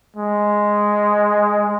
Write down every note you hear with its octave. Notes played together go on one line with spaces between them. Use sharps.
G#3